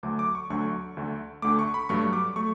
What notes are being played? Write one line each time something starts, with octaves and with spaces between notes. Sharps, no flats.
D2 D3 F#3 A3 D6
D6
C#6
D2 D3 F#3 A3 C#6
D2 D3 A3
D2 D3 A3 D6
C#6
B5
G2 F#3 A3 C#6
D6
F#3 A3 C#6